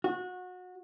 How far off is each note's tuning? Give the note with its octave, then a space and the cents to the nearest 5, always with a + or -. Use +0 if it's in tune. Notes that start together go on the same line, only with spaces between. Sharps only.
F#4 -25